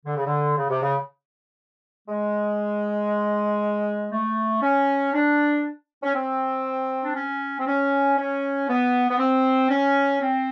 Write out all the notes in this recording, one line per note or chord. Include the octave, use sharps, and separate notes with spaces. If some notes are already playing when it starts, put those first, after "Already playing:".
D3
C#3
D3
C#3
C3
C#3
G#3
A3
C#4
D4
C#4
C4
D4
C#4
C4
C#4
C#4
B3
B3
C4
C#4
C4